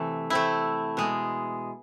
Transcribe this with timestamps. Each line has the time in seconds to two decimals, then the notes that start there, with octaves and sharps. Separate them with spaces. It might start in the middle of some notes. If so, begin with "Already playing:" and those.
Already playing: C3 E3 A3
0.30 A3 C4 E4
0.97 B2 G#3